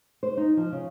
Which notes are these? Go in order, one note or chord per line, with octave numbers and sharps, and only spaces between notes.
C5
D#4
F3
C#3